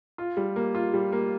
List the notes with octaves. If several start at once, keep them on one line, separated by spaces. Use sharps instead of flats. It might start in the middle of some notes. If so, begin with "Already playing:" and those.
F4
G3
A#3
F4
G3
A#3